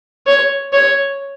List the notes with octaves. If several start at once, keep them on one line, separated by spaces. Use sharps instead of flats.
C#5
C#5